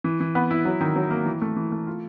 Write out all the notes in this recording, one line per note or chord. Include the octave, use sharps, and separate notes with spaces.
E3
E3
B3
E4
F#3
D#3
F#3
A#3
E3
A3
E3
A3
F4